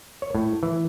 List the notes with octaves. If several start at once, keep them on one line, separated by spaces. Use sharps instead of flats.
C#5
A2
E3